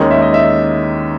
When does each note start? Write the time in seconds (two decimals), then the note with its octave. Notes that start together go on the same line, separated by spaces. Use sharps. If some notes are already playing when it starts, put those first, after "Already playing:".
Already playing: D#2 D#3 G#3 C#4 D#5
0.11 E5
0.22 D#5
0.34 E5